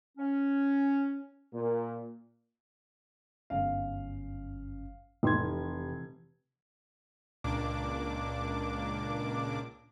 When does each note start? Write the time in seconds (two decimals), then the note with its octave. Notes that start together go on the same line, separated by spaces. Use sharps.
0.18 C#4
1.53 A#2
3.50 G1 F#2 C#4 F5
5.23 F1 C3 E3 C6 G#6
7.44 C#2 A#2 D4 D6